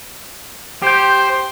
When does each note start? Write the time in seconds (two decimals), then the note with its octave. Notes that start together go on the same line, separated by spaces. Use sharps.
0.82 G4 C5 G5